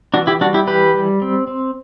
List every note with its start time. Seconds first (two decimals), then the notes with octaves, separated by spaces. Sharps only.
0.14 E3 D4 F#4
0.27 E4 G4
0.41 G3 D4 F#4
0.54 E4 G4
0.67 E3 G4 B4
0.94 G3
1.22 C4
1.47 C4